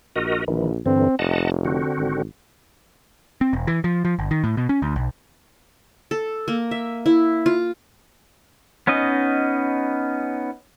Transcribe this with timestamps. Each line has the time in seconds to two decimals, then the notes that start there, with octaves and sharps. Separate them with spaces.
0.16 A#1 F#4 A#4 D#5
0.48 A#1 D#3 E3
0.86 G2 D3 E3 C4
1.19 F1 D#5 F#5 A5
1.65 D3 C4 F#4
1.97 G#1
3.41 C4
3.53 E1
3.67 E3
3.84 F3
4.05 F3
4.19 G1
4.31 D#3
4.44 A2
4.57 B2
4.69 C#4
4.82 D2
4.96 B1
6.11 A4
6.48 A#3
6.71 E5
7.06 E4
7.46 F4
8.87 B3 C#4 D#4 D#5